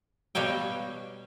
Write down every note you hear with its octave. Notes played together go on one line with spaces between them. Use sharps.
B2 G3 C#5 F5 G5